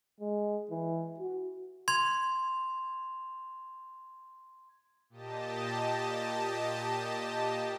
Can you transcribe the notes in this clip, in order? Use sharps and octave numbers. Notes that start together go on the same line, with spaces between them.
G#3
E3
F#4
C6 G#6 F7
A#2 G4 D#5 A5